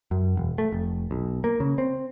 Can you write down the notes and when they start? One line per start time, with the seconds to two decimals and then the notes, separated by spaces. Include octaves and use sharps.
0.11 F#2
0.37 E1
0.58 A3
0.72 F1
1.11 B1
1.44 A#3
1.60 C#3
1.78 C4